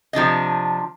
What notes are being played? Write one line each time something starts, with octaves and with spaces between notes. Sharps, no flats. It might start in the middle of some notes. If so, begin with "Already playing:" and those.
C3 F3 D4 D#5